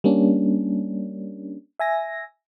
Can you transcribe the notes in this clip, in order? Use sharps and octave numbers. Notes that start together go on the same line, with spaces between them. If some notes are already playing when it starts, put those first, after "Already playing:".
G3 A#3 C#4 D4
E5 G#5 A#6